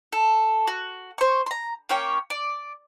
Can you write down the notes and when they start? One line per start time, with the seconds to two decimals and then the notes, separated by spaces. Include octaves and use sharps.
0.12 A4
0.67 F#4
1.18 C5 C#6
1.46 A#5 C6
1.89 A#3 C#4 C#5 G5
2.30 D5